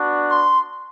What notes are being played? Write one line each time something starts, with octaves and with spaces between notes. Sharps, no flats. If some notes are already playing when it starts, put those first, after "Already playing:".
Already playing: B3 D4 F#4
C6